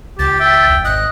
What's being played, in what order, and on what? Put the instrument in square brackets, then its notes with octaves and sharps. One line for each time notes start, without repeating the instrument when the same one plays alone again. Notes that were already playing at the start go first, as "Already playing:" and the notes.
[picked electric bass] C#2 [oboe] G4 [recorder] A6
[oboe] E5 [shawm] G5
[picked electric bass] E1
[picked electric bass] G#1 [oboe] D#5 [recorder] F#6